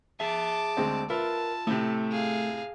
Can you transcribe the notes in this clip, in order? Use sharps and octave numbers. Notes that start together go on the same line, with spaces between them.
G#4 E5 A5 D6
D2 G#3 C4
F4 A#4 B4 E5 A5
A2 C3 A3
G#4 F5